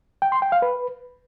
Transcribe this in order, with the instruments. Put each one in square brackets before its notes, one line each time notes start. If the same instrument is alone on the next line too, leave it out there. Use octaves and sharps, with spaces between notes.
[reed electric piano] G5
C6
G5
F5
B4